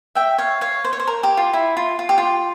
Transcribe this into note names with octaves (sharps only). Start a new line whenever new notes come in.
E5 G5
C#5 F5
C#5 F5
C5
C#5
C5
A#4
G4
F4
E4
F4
F4
G4
F4